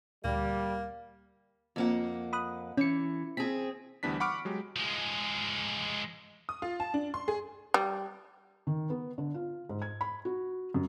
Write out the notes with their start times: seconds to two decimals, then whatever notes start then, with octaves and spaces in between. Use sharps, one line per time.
0.24 D2 A#2 G3 A#3
1.76 F2 A#3 F#5
2.33 B5 D#6 F#6
2.77 E3 C#4 C#7
3.37 C4 G#4 B6
4.03 D2 E3 G3 B3 D4 B6
4.20 F#5 B5 C#6 D6 F6 D7
4.45 F#3 G#3 G4
4.76 F3 G#3
6.49 D#6
6.62 F4
6.80 A5
6.94 D4
7.14 C6
7.28 G#4
7.74 G3
8.67 D#3
8.90 B3
9.18 D3
9.34 F4
9.69 G#2
9.82 G#6
10.01 B5
10.25 F#4
10.74 F#2